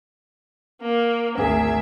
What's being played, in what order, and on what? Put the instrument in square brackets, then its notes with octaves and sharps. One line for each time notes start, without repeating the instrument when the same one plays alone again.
[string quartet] A#3
[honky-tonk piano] G#1 G#4 A#4 [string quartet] D2 E5 G#6